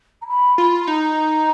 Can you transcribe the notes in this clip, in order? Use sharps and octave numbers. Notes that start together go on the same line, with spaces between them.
A#5
B5
F4
B5
D#4 A#5